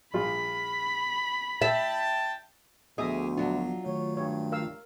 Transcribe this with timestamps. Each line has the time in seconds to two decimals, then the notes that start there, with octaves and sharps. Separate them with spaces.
0.14 A#1 G3 F4 B5
1.62 E5 G5 A5
2.98 D2 F3 B3 G4 G#4 D#5 E5 D#6
3.37 F#3 D4 F4
3.85 D#3 A3 C#5
4.17 G2 C#5
4.52 A#4 F5 E6